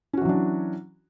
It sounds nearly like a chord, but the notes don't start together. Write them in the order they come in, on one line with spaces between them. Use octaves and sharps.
C#4 F#4 E3 F#3 D4